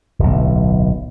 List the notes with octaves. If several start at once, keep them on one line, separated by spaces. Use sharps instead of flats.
D1 B1